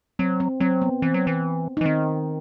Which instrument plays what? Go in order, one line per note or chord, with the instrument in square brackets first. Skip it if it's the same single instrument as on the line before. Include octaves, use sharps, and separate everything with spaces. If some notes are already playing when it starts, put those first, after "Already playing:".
[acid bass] F#3 [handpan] C4
[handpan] C4
[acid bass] F#3 [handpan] C4
[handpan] B3
[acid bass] E3 [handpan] C4
[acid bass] F#3
E3
[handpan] D#4
[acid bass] E3
[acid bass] D#3 [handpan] C4